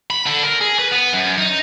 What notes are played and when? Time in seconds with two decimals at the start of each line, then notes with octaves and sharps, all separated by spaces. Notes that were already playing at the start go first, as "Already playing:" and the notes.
0.10 B5
0.26 D3
0.43 A#4
0.61 G#4
0.79 B4
0.92 B3
1.13 F#2
1.38 D#4